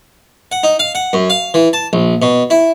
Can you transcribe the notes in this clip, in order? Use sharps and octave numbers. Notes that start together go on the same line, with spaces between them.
F#5
D#4
F5
F#5
F#2
F5
E3
A5
A#1
B2
E4